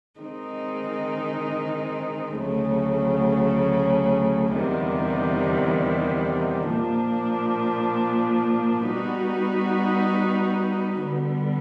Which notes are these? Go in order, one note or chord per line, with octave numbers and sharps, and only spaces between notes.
D#3 G#3 C4 D#4
D2 C#3 F#3 A3
E2 C3 D#3 G3
A#2 F3 A#3 D4
G3 B3 D#4 F#4
D3 G3 B3